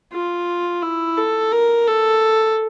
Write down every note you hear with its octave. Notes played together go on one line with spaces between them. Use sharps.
F4
E4
A4
A#4
A4